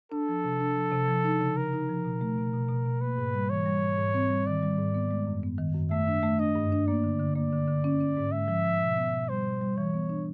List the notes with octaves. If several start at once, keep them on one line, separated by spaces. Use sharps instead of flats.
D4 A4
F3
C3
D4
F3
C3
F3
D#4
C#3
D#4 A#4
D#4
F3
B2
A3
B2
B2
B2
B2
A#3 B4
G#2
G3
E3 C#5
G3
G#2
G#2
C4
G3
D#3 D5
G3
G#2
B3
G#3
F#2
B3
D#3
F#2
A3 E5
D4
A3
D4 D#5
G2
D4
A#3 D5
D3
D3
A#3 D5
D3
D3
C#4
C#4
G#2
G#3 E5
F3
F3
B2
B3
B2
G3 C5
B2
G3
E3 C#5
B3
D4